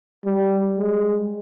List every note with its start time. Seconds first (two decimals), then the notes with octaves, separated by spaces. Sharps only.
0.25 G3
0.78 G#3